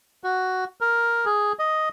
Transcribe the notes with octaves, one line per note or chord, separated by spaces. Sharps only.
F#4
A#4
G#4
D#5